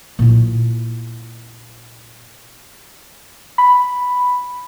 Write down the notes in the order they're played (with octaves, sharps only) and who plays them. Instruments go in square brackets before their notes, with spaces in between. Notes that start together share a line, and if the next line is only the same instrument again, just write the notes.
[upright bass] A#2 E4
[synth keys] B5